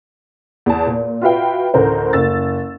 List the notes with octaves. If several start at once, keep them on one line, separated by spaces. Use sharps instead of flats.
E2 A5
A#2
F4 F#4 B4 E5 F5 G5
A1 D2 A#4 C5
F#1 E6 A6